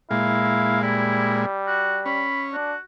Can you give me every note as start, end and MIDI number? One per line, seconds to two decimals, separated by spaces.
0.11 1.46 46
0.11 1.46 56
0.11 0.79 64
0.11 0.83 77
0.83 2.27 55
0.83 1.49 64
1.67 2.00 66
2.06 2.56 61
2.06 2.44 83
2.54 2.73 62
2.54 2.78 66